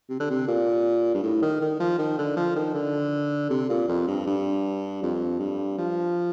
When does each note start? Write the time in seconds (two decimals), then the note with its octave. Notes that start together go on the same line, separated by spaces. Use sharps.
0.10 C3
0.20 D3
0.30 C3
0.48 A#2
1.15 G2
1.23 A2
1.42 D#3
1.61 D#3
1.80 F3
1.99 D#3
2.18 D3
2.36 F3
2.56 D#3
2.74 D3
3.51 C3
3.69 A#2
3.88 F2
4.07 G2
4.26 G2
5.03 F2
5.40 G2
5.78 F3